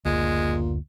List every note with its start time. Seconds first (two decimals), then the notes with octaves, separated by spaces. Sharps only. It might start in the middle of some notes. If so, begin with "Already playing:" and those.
0.05 F#1 D2 A#2 G#3